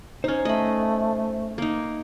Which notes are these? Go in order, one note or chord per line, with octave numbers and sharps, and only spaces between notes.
C#4 D#4 C5 F6
A3 D#5 B5
A#3 D#4